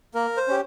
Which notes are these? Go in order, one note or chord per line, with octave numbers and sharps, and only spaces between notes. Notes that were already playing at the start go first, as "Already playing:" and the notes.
A#3 A#4
C5
C#4 G4